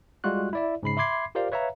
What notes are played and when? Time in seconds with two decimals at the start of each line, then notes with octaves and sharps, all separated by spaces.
0.24 G3 G#3 F4 F#4 F#6
0.53 E4 D5 E5
0.83 G#2 C#3 B5 C7
0.97 E5 B5 C6 D6 G#6 C7
1.35 F4 G4 A#4 C5 D5 F5
1.52 B4 C#5 E5 F5 A#5